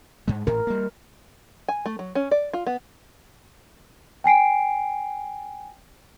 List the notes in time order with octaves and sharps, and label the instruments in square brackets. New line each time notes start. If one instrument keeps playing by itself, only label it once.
[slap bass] G#2 G#3
[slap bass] A1 A2 [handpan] A#4
[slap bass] G3 A#3
[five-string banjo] G#5
A3
F#3
C#4
D5
F4
B3
[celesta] G5 G#5 C7 D7